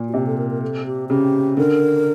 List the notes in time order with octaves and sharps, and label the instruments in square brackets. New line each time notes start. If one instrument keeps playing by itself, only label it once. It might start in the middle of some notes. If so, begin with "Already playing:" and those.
Already playing: [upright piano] A#2
[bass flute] F#4
[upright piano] C3 [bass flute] G4
[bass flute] A4
A#4
A#4
A4
G4
[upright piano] C#3 [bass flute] G4
[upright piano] D3 [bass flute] A#4